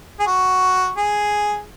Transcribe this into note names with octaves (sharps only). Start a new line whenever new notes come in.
G#4
F#4
G#4